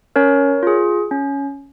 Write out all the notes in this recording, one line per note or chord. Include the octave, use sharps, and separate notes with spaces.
C#4 A#4 C#5
F4 G#4
C#4